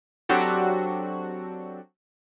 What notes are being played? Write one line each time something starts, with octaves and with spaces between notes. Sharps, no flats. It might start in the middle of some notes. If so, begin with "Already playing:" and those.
F#3 C4 D4 F#4 G4 A4